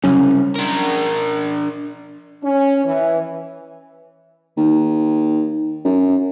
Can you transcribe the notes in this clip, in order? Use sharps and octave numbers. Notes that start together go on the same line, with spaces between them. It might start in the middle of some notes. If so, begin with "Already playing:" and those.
C2 C#3 F#3 C#4
D4 A#4
C#4
E3
D#2
F#2